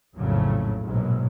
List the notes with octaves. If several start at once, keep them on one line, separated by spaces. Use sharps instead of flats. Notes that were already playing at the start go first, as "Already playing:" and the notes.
A#1 F2 A2 C#3 F#3 A3
A#1 G#2 B2 F#3